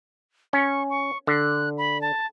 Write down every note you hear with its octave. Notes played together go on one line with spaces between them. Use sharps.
C#4 C#6
C#6
D3 F#6
B5
A5